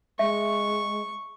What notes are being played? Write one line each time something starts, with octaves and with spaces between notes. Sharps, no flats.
G#3 E5 C#6